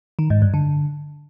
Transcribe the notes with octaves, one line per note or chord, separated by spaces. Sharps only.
D#3
G#2
G2
D3